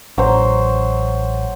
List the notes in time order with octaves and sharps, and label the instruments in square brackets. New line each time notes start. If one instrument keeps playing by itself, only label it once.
[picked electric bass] A1 [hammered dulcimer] F#3 C5